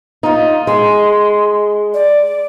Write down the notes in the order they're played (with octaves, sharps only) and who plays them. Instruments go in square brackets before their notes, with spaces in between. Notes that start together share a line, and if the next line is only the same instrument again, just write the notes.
[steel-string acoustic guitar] D#4 F4
[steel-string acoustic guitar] G#3 [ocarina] C6
[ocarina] D5